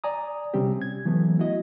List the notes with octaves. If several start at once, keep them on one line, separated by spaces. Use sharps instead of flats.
D5 G#5 A#5 D#6
C3 G3 C4 C#4 G4
G#6
E3 F#3 A3 B3
E4 F#4 D#5